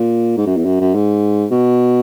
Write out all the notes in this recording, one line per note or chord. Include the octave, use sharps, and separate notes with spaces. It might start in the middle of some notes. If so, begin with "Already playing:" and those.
Already playing: A#2
G#2
F#2
E2
F#2
F#2
G#2
B2